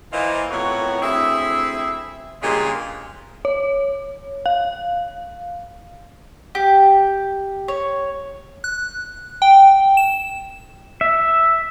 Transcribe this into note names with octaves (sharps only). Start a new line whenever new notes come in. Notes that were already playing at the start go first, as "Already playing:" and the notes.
A#2 E3 A#3 F4 C5 D#5
F2 A2 B3 F#4 A#4 C#5
D2 C4 E4 G#4 E5
G2 A#2 C#3 G#3 G4 G#4
C#5
F5
G4
C#5
F#6
G5
E7
E5